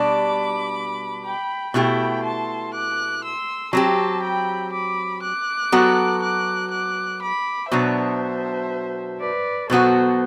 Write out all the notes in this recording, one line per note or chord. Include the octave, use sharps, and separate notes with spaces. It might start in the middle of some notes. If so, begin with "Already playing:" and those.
Already playing: B2 G3 D4 B5 D6
G5 B5
B2 A3 E4 G4 G5 B5
A5 C6
D6 F#6
C6 E6
F#3 C4 G4 A5 C6
G5 B5
B5 D6
D6 F#6
F#3 B3 F#4 A4
D6 F#6
D6 F#6
B5 D6
B2 F#3 B3 D4 C5 E5
B4 D5
B2 F#3 B3 F#4 A4 C5